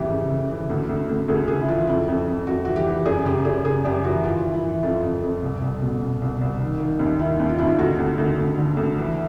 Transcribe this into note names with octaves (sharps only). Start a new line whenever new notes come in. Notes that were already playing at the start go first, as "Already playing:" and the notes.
Already playing: F2 C#3 E3 G4
C#3
C#3
E3
D2
D2
D2
D2 G#4
C#3 G#4
E4
E3 F4
F2 E4
F2
F2
F2 F#4
E3 F#4
G4
E3
F#2 G#4
C#3 G4
F#2 G#4
C#3 G#4
F#2 G4
E3 F#4
E3 F4
E3
E4
E3
F2 F4
F2
F2
C2
C2
B2
B2
C2
C2
D#3
D#3
D#2
D#3 E4
D#2
F4
D#2 E4
F4
D2 F#4
D2
D2
D2
D3
D2
E3